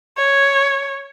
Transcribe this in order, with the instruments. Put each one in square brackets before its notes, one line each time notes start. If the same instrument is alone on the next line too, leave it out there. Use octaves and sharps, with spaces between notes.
[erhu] C#5